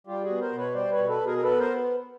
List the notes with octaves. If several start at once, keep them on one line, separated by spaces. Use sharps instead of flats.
G3 F4 G4
F#4 G#4
B3
A#4 C5
B2
B4 C#5
G3 C5 D5
B4 C#5
B2
A4 B4
B2
G#4 A#4
A#4
B3 A4 B4
A#4 C5